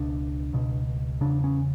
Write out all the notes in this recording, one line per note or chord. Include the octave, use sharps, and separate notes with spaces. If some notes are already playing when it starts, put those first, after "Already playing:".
Already playing: C#2 B2 D4
C#2 B2
E2 C#3 D4
C#4